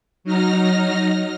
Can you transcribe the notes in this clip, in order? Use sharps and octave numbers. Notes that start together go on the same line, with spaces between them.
F#3 D#4 F6 A#6